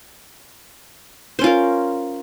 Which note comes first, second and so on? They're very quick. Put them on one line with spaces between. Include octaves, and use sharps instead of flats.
C5 C#4 F4 A#4